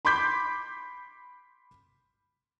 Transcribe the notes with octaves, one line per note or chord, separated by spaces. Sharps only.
B5 C6 D6 G6 B6